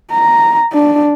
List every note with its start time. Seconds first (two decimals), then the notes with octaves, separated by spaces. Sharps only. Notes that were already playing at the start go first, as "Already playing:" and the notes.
0.12 A#5
0.73 D4